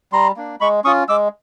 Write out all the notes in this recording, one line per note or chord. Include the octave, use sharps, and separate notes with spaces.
G3 A#5 C6
A#3 D4
G#3 B5 C#6
C#4 F4 C#6 D#6
G#3 D6 E6